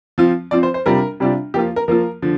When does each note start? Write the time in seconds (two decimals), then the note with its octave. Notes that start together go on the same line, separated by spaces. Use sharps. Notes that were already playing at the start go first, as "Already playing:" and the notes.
0.18 F3 C4 F4
0.51 F3 C4 F4 D5
0.63 C5
0.74 C5
0.86 C3 G3 D4 F4 A#4
1.20 C3 G3 D4 F4
1.54 F3 A#3 F4 G4
1.76 A#4
1.88 F3 A#3 F4 A#4
2.22 D3 F3